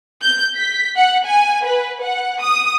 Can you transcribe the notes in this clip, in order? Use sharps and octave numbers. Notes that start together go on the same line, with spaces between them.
G6
B6
F#5
G#5
B4
F#5
D#6